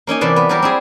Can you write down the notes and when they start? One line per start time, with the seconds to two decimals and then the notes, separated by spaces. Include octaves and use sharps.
0.07 A#3 C#4 D#4 G#5
0.21 C3 E3 D5 F#5 A5
0.36 B3
0.49 F#3 G3 G4 A#4
0.62 C4 E4 G#4